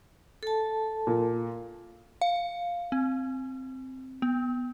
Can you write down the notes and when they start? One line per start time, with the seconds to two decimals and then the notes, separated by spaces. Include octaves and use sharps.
0.43 A4 A5
1.07 A#2
2.21 F5
2.92 C4
4.22 B3